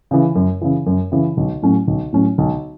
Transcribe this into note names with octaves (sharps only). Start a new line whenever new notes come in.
C#3 E3
F#2
C#3 E3
F#2
C#3 E3
B1
A2 F#3 C#4
B1
A2 F#3 C#4
B1